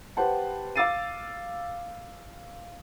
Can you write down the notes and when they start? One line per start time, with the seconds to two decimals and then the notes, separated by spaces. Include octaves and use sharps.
0.17 G4 B4 C5 F#5 A5
0.76 F5 D6 E6 A6 C7 D#7